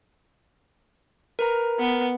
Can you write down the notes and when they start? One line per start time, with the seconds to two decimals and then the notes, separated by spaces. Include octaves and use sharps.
1.39 A#4 B4 A#5
1.79 B3